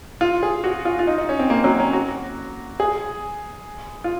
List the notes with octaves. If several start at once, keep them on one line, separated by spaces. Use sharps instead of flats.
F4
G#4
F#4
F4
F4
D#4
D#4
C#4
C4
A#3
F#3
C#4
F#4
G#4
F4